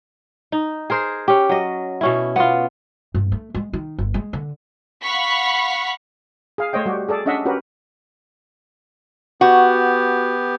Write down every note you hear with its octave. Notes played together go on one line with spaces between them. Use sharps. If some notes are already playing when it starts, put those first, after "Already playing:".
D#4
G#4 A#4 C5
C#4 G4
F#3 D#5
B2 C#4 E4
B3 F4
G2
A3
G#3
D#3
G1
G#3
D3
F5 F#5 B5 C#6 B6
G#4 F5
A3 C5 C#5 D#5 G5
G3 F#4 G4
G#4 A4 D5
C#4 D4 D#5 E5 F#5
C#4 F#4 G4 A#4 B4
B3 F#4 G4